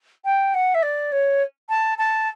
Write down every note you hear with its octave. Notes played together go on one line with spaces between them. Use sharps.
G5
F#5
E5
D5
C#5
A5
A5